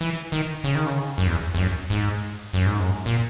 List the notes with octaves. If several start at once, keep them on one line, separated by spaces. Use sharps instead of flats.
E3
D#3
C#3
D#3
C#3
F#2
E2
E2
F#2
G#2
F#2
G#2
F#2
A#2